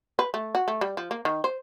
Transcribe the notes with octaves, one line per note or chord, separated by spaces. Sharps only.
B4
A3
F#4
A3
G3
F3
A#3
D#3
C5